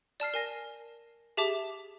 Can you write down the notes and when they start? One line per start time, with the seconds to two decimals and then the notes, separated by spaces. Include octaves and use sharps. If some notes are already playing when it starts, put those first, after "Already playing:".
0.20 D5 A5 F6 C7
0.34 A#4 G#5 A#6
1.37 G4 G#4 E5 A5 D6